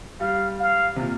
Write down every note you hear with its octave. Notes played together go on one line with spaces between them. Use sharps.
G3 F5
F5
C3
A#2